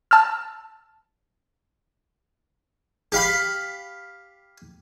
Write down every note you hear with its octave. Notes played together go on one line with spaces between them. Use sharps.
A5 E6 F6
G4 F5 B5